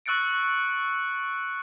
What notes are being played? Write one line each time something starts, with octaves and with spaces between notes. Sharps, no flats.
C#6 E6 F#6 A6 C#7 D7